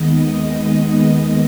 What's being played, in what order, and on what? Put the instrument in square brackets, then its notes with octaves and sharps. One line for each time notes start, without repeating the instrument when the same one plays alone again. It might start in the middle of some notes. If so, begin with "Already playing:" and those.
Already playing: [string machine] D#2 D#3 G#3 B3 D#5